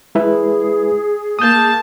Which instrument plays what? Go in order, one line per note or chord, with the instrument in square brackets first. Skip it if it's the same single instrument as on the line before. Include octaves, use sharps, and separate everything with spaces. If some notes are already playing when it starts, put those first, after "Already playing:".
[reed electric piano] G#3 E4 B4 [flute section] G#4
[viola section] A#3 A5 [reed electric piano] D#6 G6